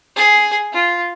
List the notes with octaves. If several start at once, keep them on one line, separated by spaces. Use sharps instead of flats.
G#4
F4